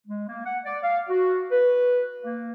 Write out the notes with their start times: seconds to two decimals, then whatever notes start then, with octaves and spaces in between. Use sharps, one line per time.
0.07 G#3
0.29 A#3
0.45 F#5
0.65 D5
0.83 F5
1.10 F#4
1.50 B4
2.22 A#3